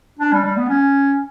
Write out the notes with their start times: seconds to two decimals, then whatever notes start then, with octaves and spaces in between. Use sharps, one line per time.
0.19 D4
0.33 G3
0.45 G3
0.57 B3
0.69 C#4